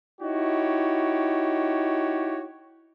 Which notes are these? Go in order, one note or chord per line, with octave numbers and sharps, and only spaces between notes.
D#4 E4 F#4 G4 C#5